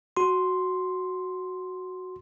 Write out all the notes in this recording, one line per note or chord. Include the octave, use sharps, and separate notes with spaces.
F#4 C6